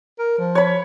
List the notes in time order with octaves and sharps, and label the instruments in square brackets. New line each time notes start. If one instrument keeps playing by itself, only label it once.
[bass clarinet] A#4
F3
[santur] C#5 B5